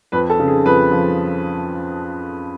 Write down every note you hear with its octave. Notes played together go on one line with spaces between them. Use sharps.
F2 B4
A4
C#3
G#4
F2 B4
F3